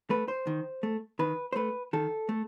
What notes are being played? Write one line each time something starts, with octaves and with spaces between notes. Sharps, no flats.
A3 B4
C5
D#3
A3
D#3 B4
C5
A3 B4
D#3 A4
A3